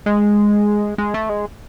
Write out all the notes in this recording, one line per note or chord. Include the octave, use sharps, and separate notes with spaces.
G#3
G#3
A3
G#3